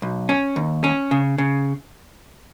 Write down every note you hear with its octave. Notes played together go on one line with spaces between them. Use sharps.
B1
C#4
D#2
C#4
C#3
C#3